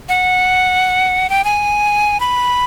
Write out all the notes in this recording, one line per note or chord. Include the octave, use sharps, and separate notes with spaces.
F#5
G5
G#5
B5